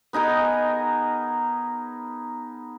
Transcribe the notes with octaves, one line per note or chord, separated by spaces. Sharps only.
B3 D#4 G#4 A#4